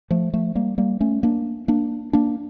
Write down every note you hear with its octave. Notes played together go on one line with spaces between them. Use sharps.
F3 A3
F3 A3
G3 A#3
G3 A#3
A3 C#4
A#3 D4
A#3 D4
A#3 D4